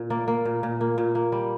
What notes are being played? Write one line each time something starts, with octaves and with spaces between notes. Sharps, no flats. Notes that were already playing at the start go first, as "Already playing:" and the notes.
Already playing: A#2
A#3 D5
A#3
A#2
A#2
A#3
A#2
A#3
G3